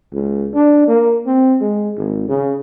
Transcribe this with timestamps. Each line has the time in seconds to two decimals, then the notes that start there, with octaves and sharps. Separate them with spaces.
0.13 C#2
0.54 D4
0.88 A#3
1.26 C4
1.61 G#3
1.97 G#1
2.28 C#3